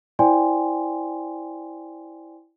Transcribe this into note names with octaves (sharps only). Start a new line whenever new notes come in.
E4 C5 D5 G5 G#5 C6